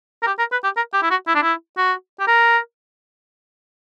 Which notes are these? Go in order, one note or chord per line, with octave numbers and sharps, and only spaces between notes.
A#4
G4
A#4
B4
G4
A#4
G4
E4
F#4
E4
D4
E4
F#4
G4
A#4